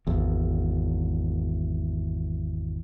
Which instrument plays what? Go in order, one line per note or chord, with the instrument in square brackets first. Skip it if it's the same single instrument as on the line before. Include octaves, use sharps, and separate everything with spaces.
[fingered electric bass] G#1 E2